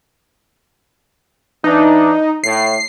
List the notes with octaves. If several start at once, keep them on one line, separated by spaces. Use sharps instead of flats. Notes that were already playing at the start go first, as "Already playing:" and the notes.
E3 D4 D#4
A2 C7